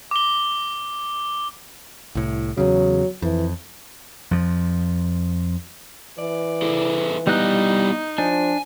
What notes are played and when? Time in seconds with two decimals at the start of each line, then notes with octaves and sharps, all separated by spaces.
0.11 D6 G7
2.15 C2 A2
2.58 E2 C#3 F#3
3.22 F2 E3
4.31 F2 F3
6.19 E3 D5
6.62 E4 G#4 A4
7.27 G3 B3 D#4 E4 D#5 F#6
8.18 F3 D4 G#5